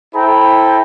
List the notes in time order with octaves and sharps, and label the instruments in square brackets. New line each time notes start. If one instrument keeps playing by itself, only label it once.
[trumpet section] E4 A4 C5 G5 A#5 B5